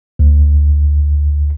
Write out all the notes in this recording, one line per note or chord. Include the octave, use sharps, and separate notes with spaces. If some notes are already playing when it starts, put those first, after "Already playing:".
D2